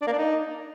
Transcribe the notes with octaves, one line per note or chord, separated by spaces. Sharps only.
D4
A#3
D4
D#4